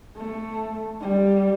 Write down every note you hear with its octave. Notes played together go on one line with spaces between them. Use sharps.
A3
G3